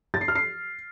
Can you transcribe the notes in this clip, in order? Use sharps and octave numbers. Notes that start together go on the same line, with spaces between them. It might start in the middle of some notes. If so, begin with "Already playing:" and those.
A6
C7
F6
C7